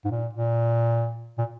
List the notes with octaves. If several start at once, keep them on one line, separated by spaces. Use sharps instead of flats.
G#2
A#2
A#2
A#2